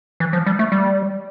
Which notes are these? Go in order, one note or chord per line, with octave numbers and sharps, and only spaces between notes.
E3
F3
G3
A3
G3